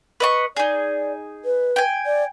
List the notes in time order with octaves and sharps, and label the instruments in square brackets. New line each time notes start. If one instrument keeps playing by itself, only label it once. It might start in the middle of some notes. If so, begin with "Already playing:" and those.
[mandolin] B4 D#5 C#6
[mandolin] D#4 G#4 [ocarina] D5
[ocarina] B4
[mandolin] G5 G#5
[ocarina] D5